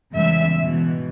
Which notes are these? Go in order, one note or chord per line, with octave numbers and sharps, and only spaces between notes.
E2 C#3 G3 G#3 E5
G#2 B2 E3